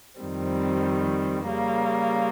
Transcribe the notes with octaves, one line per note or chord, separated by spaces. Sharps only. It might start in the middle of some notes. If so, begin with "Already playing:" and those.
F2 D#3 G3 C4
C#3 G3 A#3